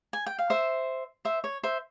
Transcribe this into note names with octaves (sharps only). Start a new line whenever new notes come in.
G#5
G5
F5
C5 E5
C5 E5
C#5
C5 E5